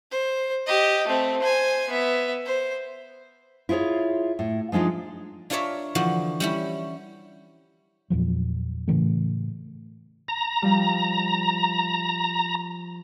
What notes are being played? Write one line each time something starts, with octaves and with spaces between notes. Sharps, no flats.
C5
G4 D#5
A3 C4
C5 G#5
B3 E5
C5
E4 F4 G#4 C5 C#5
A2
F3 G#3 D4 D#4 F4
D4 F4 A#4 C#5 D5 E5
D3 E3 F3 F#4
G3 C#4 E4
E2 A#2 F3 F#3
A2 C#3 E3 A3
A#5
F3 G3